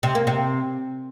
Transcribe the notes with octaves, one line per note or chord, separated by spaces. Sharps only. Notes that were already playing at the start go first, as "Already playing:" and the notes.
C3
A#3
C3